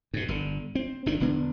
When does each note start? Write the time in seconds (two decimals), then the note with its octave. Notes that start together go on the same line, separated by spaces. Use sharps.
0.14 G2 B2
0.29 G1 D3
0.75 C4
1.06 G1 C3 D#3 D4
1.20 E1 D3 B3 D4